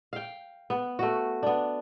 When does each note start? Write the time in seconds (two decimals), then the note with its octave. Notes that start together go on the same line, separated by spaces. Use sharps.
0.13 F5 G5
0.70 B3
0.99 A3 F#4
1.43 B3 D4